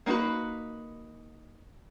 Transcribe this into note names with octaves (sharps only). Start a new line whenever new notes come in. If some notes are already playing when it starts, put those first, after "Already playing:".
A#3 D#4 F4 F#4 B4